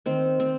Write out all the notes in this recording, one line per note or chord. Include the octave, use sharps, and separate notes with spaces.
D#3 C4
C4